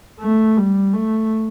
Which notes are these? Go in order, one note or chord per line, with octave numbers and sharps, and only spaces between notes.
A3
G3
A3